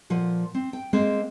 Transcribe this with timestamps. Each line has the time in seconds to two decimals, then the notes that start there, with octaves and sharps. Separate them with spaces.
0.10 A#2 F3 F4 F#5
0.55 C4
0.73 G5
0.93 G#3 A#3 C4 G#4